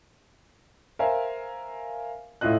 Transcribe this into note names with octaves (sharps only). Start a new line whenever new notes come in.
A#4 C5 E5 F5 G#5
A2 E4 F4 D#5 F#6